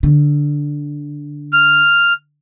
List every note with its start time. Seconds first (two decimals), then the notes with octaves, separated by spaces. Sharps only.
0.03 D3
1.53 F6